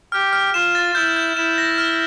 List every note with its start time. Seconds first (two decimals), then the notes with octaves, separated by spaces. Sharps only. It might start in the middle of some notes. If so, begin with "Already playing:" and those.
0.12 G4 F6
0.33 F6
0.54 F4 E7
0.75 A6
0.95 E4 G6
1.16 G6
1.37 E4 E7
1.58 A#6
1.78 F6